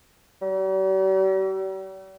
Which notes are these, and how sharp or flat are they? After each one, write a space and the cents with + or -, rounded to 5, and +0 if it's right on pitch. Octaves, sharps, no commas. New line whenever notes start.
G3 -45